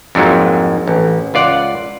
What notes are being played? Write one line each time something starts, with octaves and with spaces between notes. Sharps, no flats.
F2 G#2 F#3 A#3
A1
C#2 F4 D5 F#5